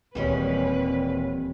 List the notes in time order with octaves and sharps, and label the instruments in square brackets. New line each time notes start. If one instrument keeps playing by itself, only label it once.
[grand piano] D#1 [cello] E3 B4 [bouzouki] G3 G#3 C#4 [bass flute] C4